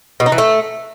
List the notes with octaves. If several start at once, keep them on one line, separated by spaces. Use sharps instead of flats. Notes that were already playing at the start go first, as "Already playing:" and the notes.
B2
D#4
E3
A3